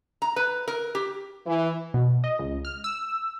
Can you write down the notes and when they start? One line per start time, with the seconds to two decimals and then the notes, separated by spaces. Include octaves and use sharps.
0.22 A#5
0.36 B4
0.68 A#4
0.95 G4
1.46 E3
1.94 B2
2.24 D#5
2.39 C#2
2.65 F6
2.84 E6